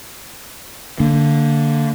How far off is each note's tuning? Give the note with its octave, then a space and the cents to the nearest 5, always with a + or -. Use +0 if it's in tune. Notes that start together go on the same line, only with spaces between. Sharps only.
D3 +0 A#3 -30